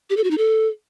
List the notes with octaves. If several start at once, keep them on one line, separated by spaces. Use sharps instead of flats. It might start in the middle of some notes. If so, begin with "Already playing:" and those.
G4
A4
F#4
D#4
A4